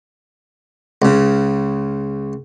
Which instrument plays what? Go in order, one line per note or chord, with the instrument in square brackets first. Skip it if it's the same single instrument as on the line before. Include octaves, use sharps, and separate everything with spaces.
[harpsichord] C#2 C#3